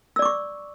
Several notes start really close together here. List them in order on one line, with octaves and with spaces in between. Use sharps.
E6 D5 D6 C#6